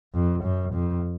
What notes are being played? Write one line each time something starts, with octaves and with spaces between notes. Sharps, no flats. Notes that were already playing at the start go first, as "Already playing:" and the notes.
F2
F#2
F2